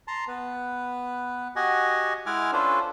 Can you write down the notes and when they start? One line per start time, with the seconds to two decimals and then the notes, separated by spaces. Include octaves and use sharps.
0.08 A5 A#5 C6
0.28 B3 B4
1.56 F#4 G4 D#5 F#5 G#5
2.26 G#3 E4 F#5 G#5 D6 F6
2.53 C#4 D4 F4 A4 B4 C5